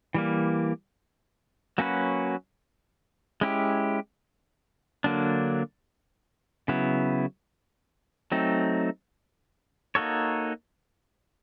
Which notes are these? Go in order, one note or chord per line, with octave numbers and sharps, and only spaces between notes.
E3 G3 A#3
F#3 A#3 C#4 F#4 B4
G#3 C#4 E4 G4
D3 F#3 A#3 D4
C#3 F#3 B3 E4
F#3 A3 C4 D#4
A#3 D#4 F#4 A4 C#5